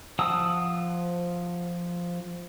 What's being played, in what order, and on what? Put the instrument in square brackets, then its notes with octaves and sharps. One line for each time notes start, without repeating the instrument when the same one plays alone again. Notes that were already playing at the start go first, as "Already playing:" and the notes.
[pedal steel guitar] F3 F#5 A5 D#6 E6